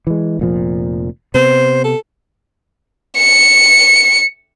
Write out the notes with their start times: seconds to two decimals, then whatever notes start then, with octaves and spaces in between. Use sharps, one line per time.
0.07 E3 G#3
0.39 F1 A#2 F3
1.34 C3 B3 C5
1.84 A4
3.18 C#7